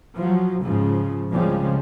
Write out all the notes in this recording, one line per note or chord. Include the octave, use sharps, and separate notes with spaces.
F3 F#3
G#2 C#3 F3
C2 C#3 F3 G3 G#3